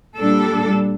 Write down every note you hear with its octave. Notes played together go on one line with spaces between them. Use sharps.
A#2 G3 D4 A4